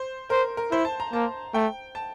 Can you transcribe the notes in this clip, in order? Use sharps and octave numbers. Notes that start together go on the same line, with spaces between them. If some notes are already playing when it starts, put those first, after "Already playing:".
Already playing: C5
A#4 C5
A#4
E4 C5
A5
A#5
A#3 A5
A3 G5
A5